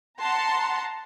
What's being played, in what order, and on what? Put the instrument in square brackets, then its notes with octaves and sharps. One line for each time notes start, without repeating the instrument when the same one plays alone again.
[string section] F#5 A5 A#5 C6